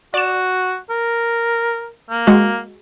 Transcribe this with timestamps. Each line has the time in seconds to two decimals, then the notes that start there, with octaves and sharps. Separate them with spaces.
0.14 F#4 D5 E7
0.90 A#4
2.10 A#3
2.27 G#3 F#4